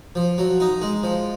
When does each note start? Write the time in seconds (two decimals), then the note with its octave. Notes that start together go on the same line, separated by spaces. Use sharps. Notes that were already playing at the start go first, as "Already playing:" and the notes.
0.15 F3
0.38 F#3
0.60 D#4
0.82 G#3
1.03 F3